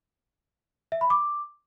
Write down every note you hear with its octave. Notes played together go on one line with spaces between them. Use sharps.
E5
B5
D6